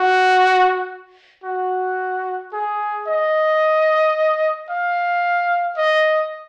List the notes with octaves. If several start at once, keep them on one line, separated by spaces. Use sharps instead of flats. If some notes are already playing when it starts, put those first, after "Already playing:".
Already playing: F#4
F#4
G#4
D#5
F5
D#5